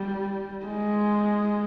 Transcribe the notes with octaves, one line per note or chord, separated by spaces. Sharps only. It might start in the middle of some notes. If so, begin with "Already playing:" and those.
Already playing: G3
G#3